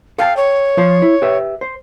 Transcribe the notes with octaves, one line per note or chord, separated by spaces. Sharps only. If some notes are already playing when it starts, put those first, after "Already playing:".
A4 F5 G5 A5
C#5
F3 F4 C5
E4
G4 B4 E5
C5